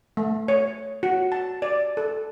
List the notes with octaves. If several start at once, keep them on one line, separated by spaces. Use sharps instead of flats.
A3
C#5
F#4
A5
D5
A4